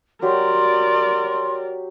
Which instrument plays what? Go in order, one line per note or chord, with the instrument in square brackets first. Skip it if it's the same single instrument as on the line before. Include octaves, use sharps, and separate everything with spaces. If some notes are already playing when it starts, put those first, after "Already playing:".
[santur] F#3 G4 [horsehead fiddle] A#4 D5 [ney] C6